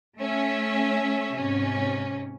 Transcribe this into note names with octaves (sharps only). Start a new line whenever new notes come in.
A3 C#4 E5
G#2 C3 C#4